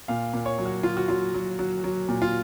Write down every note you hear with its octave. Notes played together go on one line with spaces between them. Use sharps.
A#2 F5
A#2
C#5
F#3
F#4
F#3 F4
F#4
F#3 F4
F#3
F#3
F#3
A#2
F4